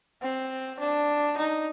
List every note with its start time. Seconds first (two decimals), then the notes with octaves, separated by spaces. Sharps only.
0.22 C4
0.80 D4
1.38 D#4